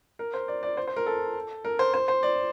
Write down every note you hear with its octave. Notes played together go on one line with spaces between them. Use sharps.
A#4
C5
D5
D5
C5
C5
A#4
A4
A#4
C5
C5
C5
D5